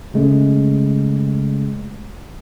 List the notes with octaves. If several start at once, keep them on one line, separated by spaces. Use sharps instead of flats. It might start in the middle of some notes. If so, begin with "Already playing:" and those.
C#3 G#3 A3 C#4